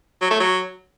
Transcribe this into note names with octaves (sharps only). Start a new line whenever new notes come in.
F#3
A3
F#3